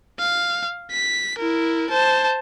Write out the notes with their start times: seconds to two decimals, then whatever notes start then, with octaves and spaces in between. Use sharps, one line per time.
0.19 F5
0.91 B6
1.38 E4 A#4
1.90 C5 A5